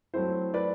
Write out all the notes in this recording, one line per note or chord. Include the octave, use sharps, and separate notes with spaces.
F#3 A3 C4 E4 C5
B4 D5